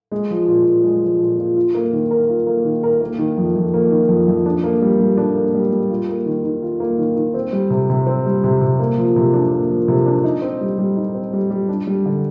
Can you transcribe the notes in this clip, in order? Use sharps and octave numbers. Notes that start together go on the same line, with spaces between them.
G#3
F3
A#2
A#2
G#3
F3
A#2
A#2
F4
A#3
D#3
A#4
F4
A#3
D#3
A#4
A#3
D#3
F2
F2
A#3
D#3
F2
F2
D4
A#3
G3
G3
D4
A#3
G3
G3
F4
A#3
D#3
D#3
F4
A#3
D#3
D#3
C4
G3
C3
C3
C4
G3
C3
C3
A#3
F3
C3
D4
A#3
F3
C3
D4
D#4
C4
G3
G3
D#4
C4
G3
G3
D4
G3
D3